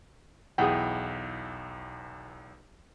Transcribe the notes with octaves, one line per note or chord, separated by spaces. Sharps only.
B1 E2 E4 G#4 F#5 G5